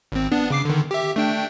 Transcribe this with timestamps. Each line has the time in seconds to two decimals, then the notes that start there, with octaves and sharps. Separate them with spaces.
0.12 G#1 C4
0.32 B3 D4
0.50 C#3 D6 C7
0.65 D3 D#3
0.91 G4 E5
1.16 A3 D4 G5